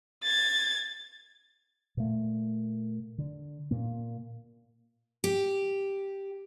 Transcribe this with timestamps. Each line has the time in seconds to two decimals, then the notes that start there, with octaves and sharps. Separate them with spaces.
0.24 G#6 A6
1.97 A#2 A3
3.18 D3
3.71 A#2 A#3
5.24 G4